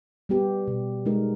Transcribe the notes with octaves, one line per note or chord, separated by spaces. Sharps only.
G3 B3 G4
B2
G#3 D#4 A#4